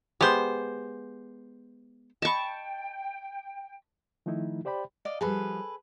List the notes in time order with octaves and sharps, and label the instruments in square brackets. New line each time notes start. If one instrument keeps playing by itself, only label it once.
[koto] G#3 B3 [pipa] G4 C5
[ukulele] D#5 B5 [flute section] G5 [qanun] A5 C#6
[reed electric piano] D#3 F3 A3 D#4 E4
G4 C5 D5 G5 B5
[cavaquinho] D5 D#5 F5
[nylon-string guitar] F3 G3 [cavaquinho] G#4 A4 B4